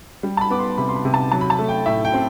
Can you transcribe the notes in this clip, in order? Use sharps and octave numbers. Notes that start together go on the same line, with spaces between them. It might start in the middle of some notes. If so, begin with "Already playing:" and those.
G3
A5
B5
B3 D6
C6
C3 B5
C6
B5
C3
A5
F#3 A5
B5
A5
A3
G5
A2 E5
G5
C4